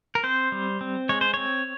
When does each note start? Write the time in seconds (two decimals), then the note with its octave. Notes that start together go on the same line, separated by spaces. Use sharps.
0.15 A#4
0.23 C4 C5
0.52 G3
0.81 C4
1.09 G#3 C#5
1.21 C5
1.34 C4 C#5